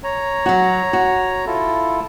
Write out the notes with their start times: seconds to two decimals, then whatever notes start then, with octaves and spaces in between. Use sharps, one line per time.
0.04 C#5 A#5
0.46 F#3 F#4
0.93 F#4
1.47 E4 F4 A4